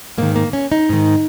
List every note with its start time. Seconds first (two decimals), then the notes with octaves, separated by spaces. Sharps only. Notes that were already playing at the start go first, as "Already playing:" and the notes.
0.18 G#2 D#3 A#3
0.36 A#3
0.53 C#4
0.72 D#4
0.89 G#2 D#3